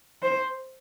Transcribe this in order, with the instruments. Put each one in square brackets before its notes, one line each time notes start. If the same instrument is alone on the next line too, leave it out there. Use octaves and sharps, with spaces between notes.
[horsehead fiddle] C5